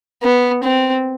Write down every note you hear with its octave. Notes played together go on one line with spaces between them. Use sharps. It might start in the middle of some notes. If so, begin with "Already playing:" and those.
B3
C4